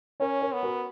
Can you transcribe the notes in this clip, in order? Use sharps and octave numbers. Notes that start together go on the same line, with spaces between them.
C#4 A#4 C#5
A#4 C#5
B3
F#4 A#4